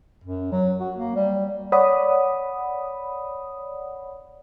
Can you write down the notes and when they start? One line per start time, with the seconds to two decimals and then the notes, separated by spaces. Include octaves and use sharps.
0.24 F#2
0.52 F#3
0.80 F#4
0.96 A#3
1.16 G3
1.72 C#5 D5 F#5 B5 D#6